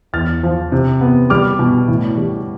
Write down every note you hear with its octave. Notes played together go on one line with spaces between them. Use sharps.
E2 F6 A6
F3
C3
B3
G3 D6 F6
B2
A2
G3